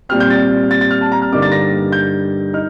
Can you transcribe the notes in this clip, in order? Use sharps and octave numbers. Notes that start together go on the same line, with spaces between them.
A#2 G3 C4 F6
G6
A6
A6
A6
F6
A5
A#5
F6
G2 D3 G3 A#3 D#4 D6
A6
A#6
G6
D#4 F6